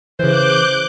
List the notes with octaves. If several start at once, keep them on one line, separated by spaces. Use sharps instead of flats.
C#3 E3 C5 D6 F#6 G6